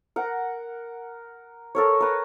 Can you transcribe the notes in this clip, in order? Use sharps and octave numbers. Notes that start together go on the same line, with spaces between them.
A#4 F#5
A4 A#4 C#5
A#4 B4